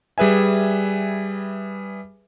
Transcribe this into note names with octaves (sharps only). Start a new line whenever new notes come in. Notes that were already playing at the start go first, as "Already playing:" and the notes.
G3 G#4 B4 E5 G#5